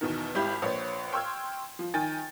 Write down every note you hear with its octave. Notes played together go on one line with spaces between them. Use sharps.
E2 B2 D#3
G#1 E4 G4 B5 G6
A#1 B4 C#5
G5 C6 C#6 E6 F6 G#6
F3
D#3 G5 G#5 A6